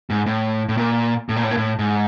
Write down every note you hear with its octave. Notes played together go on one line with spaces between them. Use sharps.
G#2
A2
A2
A#2
A2
A#2
A2
A#2
A2
G#2